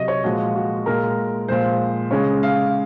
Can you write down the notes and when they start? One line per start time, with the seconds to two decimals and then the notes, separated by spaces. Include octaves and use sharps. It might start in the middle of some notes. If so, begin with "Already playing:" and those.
Already playing: C3 F#3 D#5
0.08 C#5
0.24 A#2 F3 G#3 F#4
0.56 F#4
0.86 A#2 G#3 A#4
1.48 A#2 F3 G#3 C5
2.11 C#3 G#3 C#5
2.43 F5